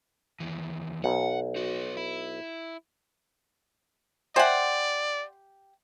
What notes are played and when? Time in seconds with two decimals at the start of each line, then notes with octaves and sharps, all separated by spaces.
0.40 D#2 E3
1.04 B1 F#5
1.56 D#4 F#4
1.97 E4
4.36 G4 C5 D5 E5 F#5 G#5